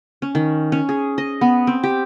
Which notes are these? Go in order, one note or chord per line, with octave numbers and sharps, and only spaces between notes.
C#4
D#3
C#4
G#4
D#5
B3
C4
G4